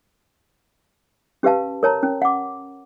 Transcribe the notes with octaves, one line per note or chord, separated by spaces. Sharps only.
C#4 G4 B4 F5 A5
A#4 C#5 A5 A#5
C#4
F#5 D6